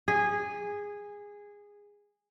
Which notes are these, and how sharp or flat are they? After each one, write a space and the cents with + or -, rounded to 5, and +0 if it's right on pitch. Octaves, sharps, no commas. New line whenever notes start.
G#4 -15